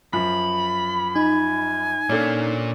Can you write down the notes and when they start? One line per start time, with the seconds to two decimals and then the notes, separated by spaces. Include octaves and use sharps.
0.13 F#2 F3 B5
1.16 D#4 G#5
2.09 A#2 A#3 C#4 D4 A4